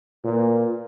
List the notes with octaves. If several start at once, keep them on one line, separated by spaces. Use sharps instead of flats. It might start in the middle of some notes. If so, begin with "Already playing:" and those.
A#2 F4 B4